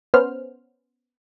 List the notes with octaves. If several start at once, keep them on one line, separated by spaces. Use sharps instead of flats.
B3 C#4 C5 F6